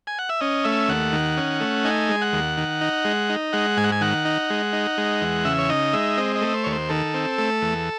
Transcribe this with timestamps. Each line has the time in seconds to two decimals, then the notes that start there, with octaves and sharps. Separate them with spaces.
0.07 G#5
0.19 F#5
0.29 E5
0.41 C#4 D#5
0.64 A3 E5
0.89 D#2 F#5
1.13 D#3
1.37 C#4
1.60 A3
1.84 D#4 G#5
2.09 G#3
2.21 F#5
2.33 D#2
2.58 D#3
2.81 D#4
3.05 G#3
3.30 D#4
3.53 G#3 F#5
3.77 G#2 G#5
3.84 F#5
3.92 G#5
4.01 D#3 F#5
4.25 D#4
4.50 G#3
4.73 D#4
4.98 G#3
5.21 E2
5.45 C#3 E5
5.59 C#5
5.70 D#4 D#5
5.93 G#3 E5
6.17 C4 D#5
6.36 D#5
6.42 A3
6.54 C5
6.64 D#2 C#5
6.72 C5
6.89 D#3 A4
7.14 C4
7.38 A3
7.62 E2